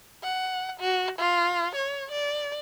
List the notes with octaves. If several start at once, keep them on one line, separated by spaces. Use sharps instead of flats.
F#5
F#4
F4
C#5
D5